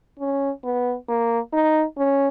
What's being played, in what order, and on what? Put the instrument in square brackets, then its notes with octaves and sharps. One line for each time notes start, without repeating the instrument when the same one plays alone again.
[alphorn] C#4
B3
A#3
D#4
C#4